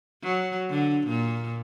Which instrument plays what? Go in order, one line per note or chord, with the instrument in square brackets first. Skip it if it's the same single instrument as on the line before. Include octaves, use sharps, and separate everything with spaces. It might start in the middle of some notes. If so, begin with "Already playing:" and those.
[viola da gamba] F#3
D3
A#2